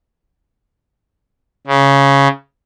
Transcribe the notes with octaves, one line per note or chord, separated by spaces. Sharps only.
C#3